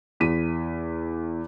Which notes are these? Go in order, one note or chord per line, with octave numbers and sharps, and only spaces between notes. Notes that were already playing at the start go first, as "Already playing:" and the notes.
E2 B6 D#7